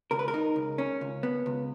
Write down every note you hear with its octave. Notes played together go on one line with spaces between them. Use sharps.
C#2 A#4
B4
A#4
D#4
C#2
C#4
C#2
B3
C#2